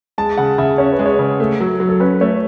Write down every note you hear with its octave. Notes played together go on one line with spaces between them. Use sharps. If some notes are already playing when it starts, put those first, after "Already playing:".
G#3 A5
C#3 F#5
C#3 E5
C#4 C#5
B4
G#3
C#5
C#3
A3
F#3
F#3
A4
C#4 B4
A3 C#5